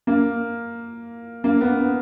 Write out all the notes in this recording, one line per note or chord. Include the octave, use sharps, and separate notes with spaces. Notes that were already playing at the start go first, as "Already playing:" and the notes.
A#3
A#3
B3
B3